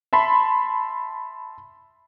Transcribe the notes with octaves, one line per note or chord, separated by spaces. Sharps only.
E5 A5 B5 C6